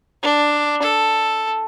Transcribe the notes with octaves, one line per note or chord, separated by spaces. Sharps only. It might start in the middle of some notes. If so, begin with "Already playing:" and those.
D4
A4